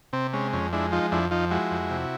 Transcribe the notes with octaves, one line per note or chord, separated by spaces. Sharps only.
C3 C4
G#3 C#4
F2 C#4
G#3 D4 E4
F3 D#4 F4
F2 D4 E4
F3 D#4 F4
G#3 E4 F#4
F2
C3